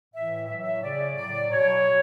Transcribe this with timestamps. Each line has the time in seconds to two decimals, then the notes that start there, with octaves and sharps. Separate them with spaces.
0.13 A2 E3 E5
0.48 A2 F#3 E5
0.62 E5
0.82 C#3 F#3 D5
1.16 A2 F#3 D5
1.51 B2 F#3 C#5
1.85 B2